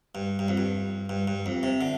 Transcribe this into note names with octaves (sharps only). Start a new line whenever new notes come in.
G2
G2
F2
G2
G2
G2
F2
C3
D3